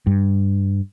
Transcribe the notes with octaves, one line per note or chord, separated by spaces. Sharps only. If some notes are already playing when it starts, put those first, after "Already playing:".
G2